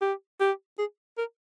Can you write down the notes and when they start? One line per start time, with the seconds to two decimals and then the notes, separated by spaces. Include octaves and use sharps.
0.01 G4
0.40 G4
0.79 G#4
1.18 A#4